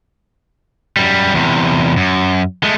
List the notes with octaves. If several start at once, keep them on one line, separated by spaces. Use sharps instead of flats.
F#2 G3
E2 C3
F#2
G#3 A3